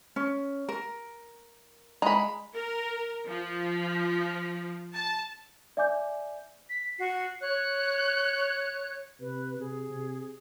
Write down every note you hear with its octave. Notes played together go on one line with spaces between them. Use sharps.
C#4
A#4
G#3 A#5 B5
A#4
F3
A5
D5 E5 G#5 D6 G6
B6
F#4 C7
C#5 F#6
C3 B4
C3 G#4
C3